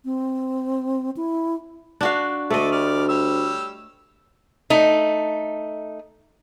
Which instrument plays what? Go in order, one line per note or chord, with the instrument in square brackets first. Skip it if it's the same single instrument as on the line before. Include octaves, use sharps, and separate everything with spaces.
[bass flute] C4
E4
[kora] D4 F#4 F5
[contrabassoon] D2 [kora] A3 D#5 [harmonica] A4 D5
[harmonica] G3 D5 F6
G3 C#5 E6
[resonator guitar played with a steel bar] A3 D#4